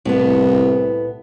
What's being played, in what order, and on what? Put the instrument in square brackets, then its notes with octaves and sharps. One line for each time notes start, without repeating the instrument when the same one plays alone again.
[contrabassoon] C2 [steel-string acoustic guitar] A2 B3